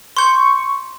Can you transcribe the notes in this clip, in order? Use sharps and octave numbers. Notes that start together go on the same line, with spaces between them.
C6 C#6 G6